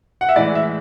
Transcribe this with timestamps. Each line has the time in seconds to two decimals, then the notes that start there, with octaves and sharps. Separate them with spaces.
0.21 F#5
0.29 E5
0.36 A2 E3 G#3 D5
0.55 E5